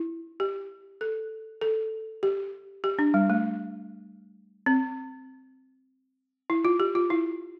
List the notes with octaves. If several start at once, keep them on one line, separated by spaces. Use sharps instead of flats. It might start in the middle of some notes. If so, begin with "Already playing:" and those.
Already playing: E4
G4
A4
A4
G4
G4
D4
G3
A3
C4
E4
F4
G4
F4
E4